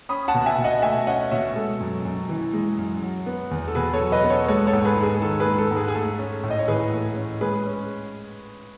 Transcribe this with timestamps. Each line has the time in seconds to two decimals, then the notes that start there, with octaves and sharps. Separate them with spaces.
0.09 C#4 B5 D#6
0.28 F#5 A5
0.34 B2
0.46 E5 G#5
0.58 B2
0.64 D#5 F#5
0.82 A3 E5 G#5
1.07 C#4 D#5 F#5
1.31 B2 C#5 E5
1.56 G#3 A4
1.80 F#2
2.05 F#2
2.29 E3
2.53 G#3
2.78 F#2
3.02 F#3
3.26 B3
3.51 E2
3.68 A4
3.75 B2 G#4 B4
3.93 A4 C#5
4.00 F#3
4.12 B4 D#5
4.24 B3
4.30 A4 C#5
4.48 G#3 A4 C#5
4.67 A4 C#5
4.73 G#2
4.85 G#4 B4
4.97 G#2
5.03 G#4
5.22 D#3 A4
5.40 G#4 B4
5.46 G#3
5.58 A4
5.71 G#2
5.77 G#4
5.88 G#4
5.95 A3 A4
6.19 C#4
6.43 A2
6.50 D#5
6.59 C#5
6.68 E3 G#4 B4
6.92 A3
7.16 C#4
7.41 G#3 G#4 B4
7.66 C#4